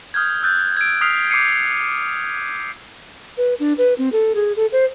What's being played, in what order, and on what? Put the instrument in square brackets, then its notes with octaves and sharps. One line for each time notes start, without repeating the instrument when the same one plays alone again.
[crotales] D#6 F6 G6 G#6
E6 F#6 G6 A6
G#6 D7
D#6 F6 F#6 B6 C7 F7
D6 G6 C7 C#7 D#7
C#7
[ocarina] B4
D4
B4
C4
A4
G#4
A4
C5